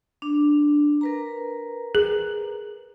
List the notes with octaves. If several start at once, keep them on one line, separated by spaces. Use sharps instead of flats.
D4
A#4 B4 A#5
G#4